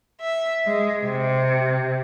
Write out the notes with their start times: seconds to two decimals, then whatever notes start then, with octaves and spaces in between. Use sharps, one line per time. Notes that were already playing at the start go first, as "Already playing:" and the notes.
0.20 E5
0.66 G#3
1.03 C3